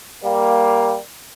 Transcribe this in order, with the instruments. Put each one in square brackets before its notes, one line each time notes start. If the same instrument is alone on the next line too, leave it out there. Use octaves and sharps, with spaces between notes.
[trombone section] G3 A#3